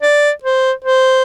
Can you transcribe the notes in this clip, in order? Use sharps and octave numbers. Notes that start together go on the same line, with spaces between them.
D5
C5
C5